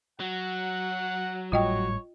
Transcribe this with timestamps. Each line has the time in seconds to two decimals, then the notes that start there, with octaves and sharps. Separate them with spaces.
0.20 F#3 F#5
1.52 G#1 A2 G3 F4 C#5 D#5 G5